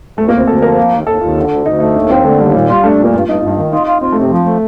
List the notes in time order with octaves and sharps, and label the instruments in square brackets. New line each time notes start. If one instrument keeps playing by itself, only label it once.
[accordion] D2 [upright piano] A3
[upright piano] A#3
[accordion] D2
[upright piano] C4
[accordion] D2 [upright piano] A4
[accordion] F3 [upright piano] A#4
[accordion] A#3
D#2
[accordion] D#2 [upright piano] A4
[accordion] D#2 [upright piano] F4
[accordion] D3
D2
[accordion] D2 [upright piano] D#4
[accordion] A3 [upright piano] D#4
[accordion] D#2 [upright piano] D4
[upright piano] A#3 [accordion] C4
[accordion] D3 [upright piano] A3
[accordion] D#2 [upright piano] G3
[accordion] A#2 [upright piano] G3
[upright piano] G3 [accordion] F4
[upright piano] A3 [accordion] D4
[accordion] A#2
[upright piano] A#3
[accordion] G2 [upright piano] F4
[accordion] G2 [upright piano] D#4
[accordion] G2 [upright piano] F4
[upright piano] D#4
[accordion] D#3
[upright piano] D#4 [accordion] F4
[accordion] F4
[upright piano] C4 [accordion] F4
[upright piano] A3
[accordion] C3 [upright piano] C4
[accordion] F3
A3